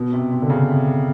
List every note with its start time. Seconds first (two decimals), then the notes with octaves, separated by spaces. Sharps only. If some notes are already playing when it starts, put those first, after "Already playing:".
Already playing: B2
0.13 C3
0.31 C3
0.42 D3
0.50 C#3
0.69 C3